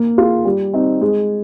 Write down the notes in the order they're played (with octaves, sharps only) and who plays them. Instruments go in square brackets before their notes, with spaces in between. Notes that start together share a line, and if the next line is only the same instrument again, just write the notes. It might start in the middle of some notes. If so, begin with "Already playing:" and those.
Already playing: [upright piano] A#3
F4 G#4
G3
C4 D#4
G#3